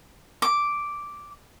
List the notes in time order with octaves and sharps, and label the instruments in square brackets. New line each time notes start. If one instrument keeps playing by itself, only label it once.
[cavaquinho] D6